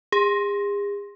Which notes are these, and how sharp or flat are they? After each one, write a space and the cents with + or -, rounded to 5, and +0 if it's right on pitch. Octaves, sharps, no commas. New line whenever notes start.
G#4 -40